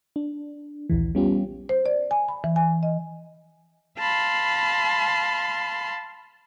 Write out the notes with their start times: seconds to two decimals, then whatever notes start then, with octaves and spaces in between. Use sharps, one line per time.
0.16 D4
0.90 A#1 D#2 E3
1.15 G3 B3 C#4 F4 G4
1.69 C5
1.86 D5
2.11 G#5
2.28 B5
2.44 E3
2.56 G#5
2.83 D#5
3.97 F5 A5 B5 C6